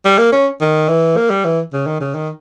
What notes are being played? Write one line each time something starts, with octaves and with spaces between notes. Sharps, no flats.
G3
A#3
C#4
D#3
E3
A#3
G3
E3
C#3
D#3
C#3
D#3